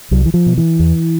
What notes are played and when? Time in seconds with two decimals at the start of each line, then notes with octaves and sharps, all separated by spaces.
0.11 C2 F#3
0.26 E3
0.34 F3
0.46 B2
0.57 E3
0.79 E2